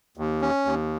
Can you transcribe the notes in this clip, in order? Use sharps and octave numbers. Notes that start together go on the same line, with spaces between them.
D#2
C#4
D#2